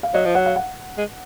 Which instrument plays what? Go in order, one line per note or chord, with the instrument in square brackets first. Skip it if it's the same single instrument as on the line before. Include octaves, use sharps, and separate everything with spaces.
[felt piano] F5
[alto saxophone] F#3 [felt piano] D#5
[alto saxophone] F3
[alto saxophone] F#3 [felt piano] F#5
[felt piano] F5
F#5
[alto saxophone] G#3